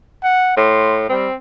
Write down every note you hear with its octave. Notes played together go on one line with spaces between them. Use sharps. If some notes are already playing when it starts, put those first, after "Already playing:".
F#5
A2 C6
G3 C4